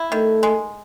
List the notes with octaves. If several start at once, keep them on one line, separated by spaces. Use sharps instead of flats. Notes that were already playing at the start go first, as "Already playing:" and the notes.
Already playing: E4
D#3 A3
G#3